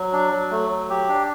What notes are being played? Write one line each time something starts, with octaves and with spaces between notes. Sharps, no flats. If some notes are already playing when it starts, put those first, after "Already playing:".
Already playing: F#3
D4
F#3
A3
F#3
G4
D4